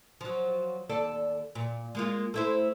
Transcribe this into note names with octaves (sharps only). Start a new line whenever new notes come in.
F3 F#3
D#2 A4 D5
A#2
G#3 A#3 F4
A3 E4 C5